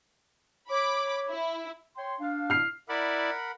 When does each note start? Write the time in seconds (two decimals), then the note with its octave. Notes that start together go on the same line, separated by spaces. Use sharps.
0.70 C#5 B5 D6
1.31 E4
1.97 C#5 G5 C6
2.20 D4 F5
2.50 F6 C7
2.89 E4 A#4 D5 F#5 B5